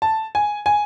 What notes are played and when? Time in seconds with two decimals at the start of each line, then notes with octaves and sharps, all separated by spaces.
0.02 A5
0.35 G#5
0.66 G#5